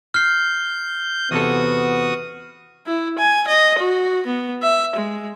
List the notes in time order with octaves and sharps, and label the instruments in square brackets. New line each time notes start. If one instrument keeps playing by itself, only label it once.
[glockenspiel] F6 C7 [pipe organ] G6
[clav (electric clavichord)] E2 C3 A4 [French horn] B3 [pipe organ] F#4 D#6
[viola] E4
G#5
D#5
F#4
B3
E5
G#3